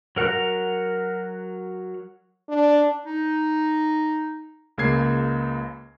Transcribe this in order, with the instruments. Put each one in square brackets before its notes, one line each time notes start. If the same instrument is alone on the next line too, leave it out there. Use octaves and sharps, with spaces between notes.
[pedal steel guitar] F#3 A#4 F#5 A#5 F#6
[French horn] D4
[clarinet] D#4
[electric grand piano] C#2 C#3 A#3 G#6 C7